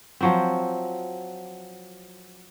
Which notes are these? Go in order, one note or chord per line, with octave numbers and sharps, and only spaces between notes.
F3 F#3 C4